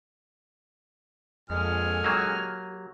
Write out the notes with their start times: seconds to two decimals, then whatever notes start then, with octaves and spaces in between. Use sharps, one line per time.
1.50 F2 A#2 D3 G#3 G#5 F6
2.04 F#3 A#3 G4